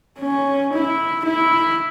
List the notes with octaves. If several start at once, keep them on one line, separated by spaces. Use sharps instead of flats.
C#4
E4
E4